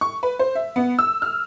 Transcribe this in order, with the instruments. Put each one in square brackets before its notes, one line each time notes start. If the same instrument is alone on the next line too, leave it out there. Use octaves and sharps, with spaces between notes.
[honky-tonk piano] C#6
B4
C5
E5
B3
E6
F6